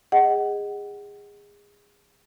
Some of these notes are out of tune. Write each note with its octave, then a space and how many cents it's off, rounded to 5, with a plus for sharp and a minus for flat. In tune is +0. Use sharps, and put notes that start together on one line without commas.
G#4 -25 D#5 +0 F#5 +25